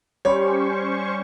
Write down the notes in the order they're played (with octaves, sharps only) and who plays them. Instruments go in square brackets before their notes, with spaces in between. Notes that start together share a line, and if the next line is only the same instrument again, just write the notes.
[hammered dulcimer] G3 [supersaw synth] C#4 C5 C#6 [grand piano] C#5